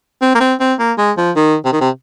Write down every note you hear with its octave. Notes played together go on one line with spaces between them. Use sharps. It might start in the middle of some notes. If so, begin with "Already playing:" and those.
C4
A#3
C4
C4
A#3
G#3
F3
D#3
C3
D#3
C3